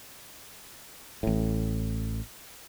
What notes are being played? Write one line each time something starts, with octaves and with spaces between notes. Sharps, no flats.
A1 A2